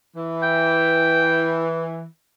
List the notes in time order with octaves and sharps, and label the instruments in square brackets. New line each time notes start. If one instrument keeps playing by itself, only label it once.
[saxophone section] E3
[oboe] G5